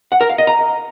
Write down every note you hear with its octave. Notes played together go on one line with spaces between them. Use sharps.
F#5
A#4
F5
D#5
A#5